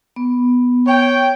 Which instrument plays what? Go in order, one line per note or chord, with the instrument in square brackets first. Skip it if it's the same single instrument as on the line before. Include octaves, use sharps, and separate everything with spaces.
[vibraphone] B3
[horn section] C#5 G5